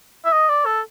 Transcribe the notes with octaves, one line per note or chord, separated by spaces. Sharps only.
E5
D#5
D5
A4